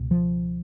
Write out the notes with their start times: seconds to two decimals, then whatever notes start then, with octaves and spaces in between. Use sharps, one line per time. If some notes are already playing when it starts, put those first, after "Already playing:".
Already playing: C#2 B2
0.11 F3